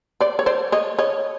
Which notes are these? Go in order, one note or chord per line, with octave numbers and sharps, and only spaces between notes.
C5 D5
C#5
C5 D5
C#5 D#5
C#5 D#5